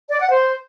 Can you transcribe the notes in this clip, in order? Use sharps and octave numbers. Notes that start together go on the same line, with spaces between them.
D5
F#5
C5